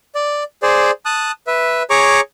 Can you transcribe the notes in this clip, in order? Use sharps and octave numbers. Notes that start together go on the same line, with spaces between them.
D5
G#4 C5 D5
A5 D#6 F#6
B4 E5
G#4 C#5 A#5 C#6 D6